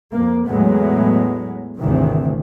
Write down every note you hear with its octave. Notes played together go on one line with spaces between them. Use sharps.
F2 A#3
E2 A2 F#3 G#3 B3
G#1 D2 C3 D#3 E3